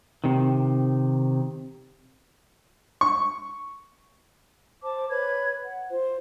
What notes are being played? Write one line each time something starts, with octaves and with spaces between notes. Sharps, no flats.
C3 D#3
C#6
C5 A5 D6
B4 C#5 B5 G#6
F#5
F4 C5